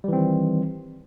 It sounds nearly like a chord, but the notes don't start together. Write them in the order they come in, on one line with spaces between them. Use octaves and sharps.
G3 E3 C4 D#3